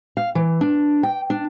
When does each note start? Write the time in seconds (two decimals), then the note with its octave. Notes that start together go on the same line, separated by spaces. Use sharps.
0.17 F5
0.35 E3
0.61 D4
1.03 G5
1.30 D4